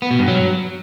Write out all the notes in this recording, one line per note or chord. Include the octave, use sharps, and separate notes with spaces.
B3
B2
G2
F#3